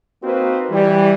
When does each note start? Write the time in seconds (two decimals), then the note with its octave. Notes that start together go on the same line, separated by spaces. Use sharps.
0.24 A#3 C4 D#4 F#4 B4 C5
0.71 E3 G3